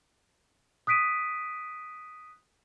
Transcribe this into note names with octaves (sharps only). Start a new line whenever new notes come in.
D#6 F#6 B6 D7 D#7